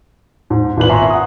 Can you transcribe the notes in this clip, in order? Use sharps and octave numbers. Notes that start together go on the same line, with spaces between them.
G#2
G#1 A#2 B4 F#7
E5 G#5 A#5 C6 C#6
F#5 D#6